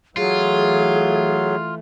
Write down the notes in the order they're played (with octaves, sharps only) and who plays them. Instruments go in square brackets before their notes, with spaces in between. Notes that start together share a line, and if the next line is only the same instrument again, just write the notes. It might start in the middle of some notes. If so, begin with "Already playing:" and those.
[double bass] E3 A3 [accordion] F#3 [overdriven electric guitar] F4 [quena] G#4